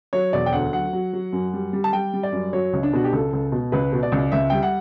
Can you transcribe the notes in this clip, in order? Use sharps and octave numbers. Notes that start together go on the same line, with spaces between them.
F#3 C#5
E1 D5
G5
D2 F#5
F#3 F#5
F#3
F#3
F#2
G3
G3
A5
G3 G5
G3
D5
F#2
F#3 C#5
C#2
D4
B2 F#4
G4
C#2 A4
C#2
B2
C#2 B4
B2
D5
C#2
C#2 E5
G3 G5
F#5